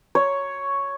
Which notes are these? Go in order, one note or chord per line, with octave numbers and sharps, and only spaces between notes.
C#5